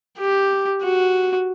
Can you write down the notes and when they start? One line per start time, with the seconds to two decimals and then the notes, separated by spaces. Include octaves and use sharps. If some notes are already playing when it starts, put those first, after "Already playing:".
0.18 G4
0.82 F#4